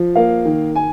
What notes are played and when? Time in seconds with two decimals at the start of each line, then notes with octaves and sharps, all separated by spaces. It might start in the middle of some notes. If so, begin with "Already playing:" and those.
Already playing: F3
0.15 A#3 F5
0.45 D#3
0.76 G#5